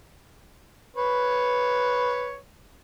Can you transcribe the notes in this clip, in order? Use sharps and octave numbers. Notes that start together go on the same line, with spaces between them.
B4 C#5